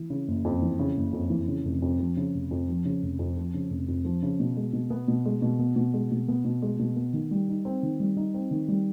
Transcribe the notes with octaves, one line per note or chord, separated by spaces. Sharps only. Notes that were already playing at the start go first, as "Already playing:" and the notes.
Already playing: E3
C#3
F#1
F2
E3
C#3
F#1
F2
E3
C#3
F1
F2
F3
C#3
F1
F2
F3
C#3
F1
F2
F3
C#3
F1
F2
F3
C#3
B2
G#3
B2
B3
B2
G#3
B2
B3
B2
G#3
B2
B3
B2
G#3
B2
B3
D#3
G3
D#4
C4
D#3
G3
D#4
C4
D#3
G3